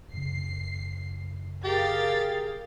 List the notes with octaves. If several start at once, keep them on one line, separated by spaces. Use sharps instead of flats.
F#2 C#3 C7
G4 G#4 A#4 F5 A6